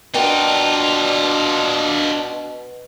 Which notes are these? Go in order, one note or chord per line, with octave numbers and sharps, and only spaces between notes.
B2 D4 D#4 F4 F#4 A#4 G5